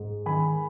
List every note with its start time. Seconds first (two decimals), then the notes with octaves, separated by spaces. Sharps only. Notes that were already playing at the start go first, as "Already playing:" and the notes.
Already playing: G#2 G#3
0.26 D#3 G#5 B5